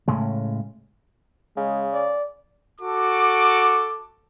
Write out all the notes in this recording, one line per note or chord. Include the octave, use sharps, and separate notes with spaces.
A2 C#3 G#3
C#3 G#3
D5
F#4 A4 D6